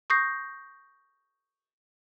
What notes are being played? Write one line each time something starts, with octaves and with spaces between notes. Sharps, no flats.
C#6 D#6 G6 A#6 C7